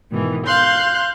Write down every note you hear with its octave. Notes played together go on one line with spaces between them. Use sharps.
G#2 B2 D#3 E3
F5 C6 F#6 G6